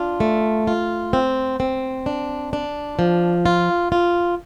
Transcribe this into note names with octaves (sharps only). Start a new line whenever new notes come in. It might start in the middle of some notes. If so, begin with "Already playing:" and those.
Already playing: D4 F4
A3
F4
C4
C4
D4
D4
F3
F4
F4